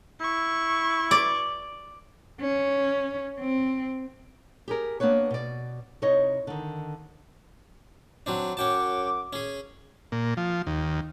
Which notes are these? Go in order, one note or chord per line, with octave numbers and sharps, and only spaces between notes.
E4 C#6
D5
C#4
C4
G4 G#4 A#4
A#3 B3 D4 B4 C#5
B2 D5
C3 D#4 E4 C#5 D#5
D3 D#3
F#3 C4 D4
F#2 C#4 F#5 G5 A5 D6
C#4 G#4
A#2
F3
D#2